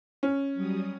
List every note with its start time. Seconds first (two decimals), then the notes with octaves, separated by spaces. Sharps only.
0.23 C#4
0.54 F#3 G3 D#6